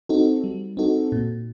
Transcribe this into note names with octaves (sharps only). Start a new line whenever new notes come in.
C4 D#4 F#4 A4
G3
C4 D#4 F#4 A4
A#2